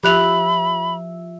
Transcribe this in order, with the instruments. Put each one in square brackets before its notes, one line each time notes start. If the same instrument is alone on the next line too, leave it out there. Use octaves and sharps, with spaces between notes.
[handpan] F3 E5 [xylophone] G4 F#6 F7 [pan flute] B5